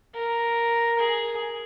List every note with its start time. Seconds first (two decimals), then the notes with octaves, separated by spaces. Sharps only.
0.15 A#4
0.99 G#4